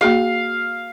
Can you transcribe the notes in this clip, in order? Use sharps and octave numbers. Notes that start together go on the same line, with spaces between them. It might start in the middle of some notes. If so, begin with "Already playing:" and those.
A#3 F#4 G#4 F5